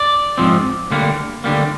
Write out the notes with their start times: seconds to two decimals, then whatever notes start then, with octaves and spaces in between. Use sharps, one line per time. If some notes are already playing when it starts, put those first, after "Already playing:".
Already playing: D5
0.38 G#2 F3 C4
0.91 D2 D3 G3 A#3
1.44 D2 D3 G3 A#3